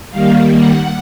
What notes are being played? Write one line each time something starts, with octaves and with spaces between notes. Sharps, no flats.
D#3 G3 A#3 F5
F#5